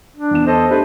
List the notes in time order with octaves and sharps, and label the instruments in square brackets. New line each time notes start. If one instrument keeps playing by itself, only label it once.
[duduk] D4
[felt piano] E2 B3 E7
[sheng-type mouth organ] A4 D#5 [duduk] C5
[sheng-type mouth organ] A3 B4 [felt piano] D4 G4 [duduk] C5